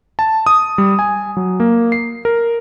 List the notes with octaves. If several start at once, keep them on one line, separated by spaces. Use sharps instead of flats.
A5
D#6
G3
G#5
F#3
A#3
C7
A#4